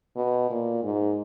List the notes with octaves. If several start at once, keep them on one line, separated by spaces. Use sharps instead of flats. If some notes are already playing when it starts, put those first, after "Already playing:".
B2
A#2
G#2